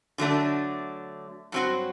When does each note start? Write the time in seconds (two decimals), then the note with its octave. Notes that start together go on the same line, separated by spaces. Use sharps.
0.18 D3 F#3 A3 D4
1.52 G2 F#3 C4 F#4 C5